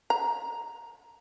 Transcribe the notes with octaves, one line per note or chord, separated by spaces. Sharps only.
A#5